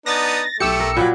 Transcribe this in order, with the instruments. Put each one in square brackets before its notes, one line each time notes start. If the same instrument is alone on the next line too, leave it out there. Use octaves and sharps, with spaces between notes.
[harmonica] B3 D4 D#4 [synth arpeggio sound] A6 A#6
[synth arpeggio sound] B1 E6 C#7 [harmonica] A3 [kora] G4
[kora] A#4
[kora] A#2 F#3 [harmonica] B5